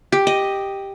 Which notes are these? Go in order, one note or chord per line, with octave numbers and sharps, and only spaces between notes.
G4
D#5